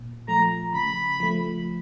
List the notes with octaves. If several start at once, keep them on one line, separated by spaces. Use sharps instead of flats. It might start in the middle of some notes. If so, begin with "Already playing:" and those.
Already playing: A#2
F3 A3 A#5
C#3 B5
F3 A3